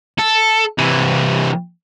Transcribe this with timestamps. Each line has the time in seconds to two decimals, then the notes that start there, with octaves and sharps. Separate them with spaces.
0.19 A4
0.78 C3 E3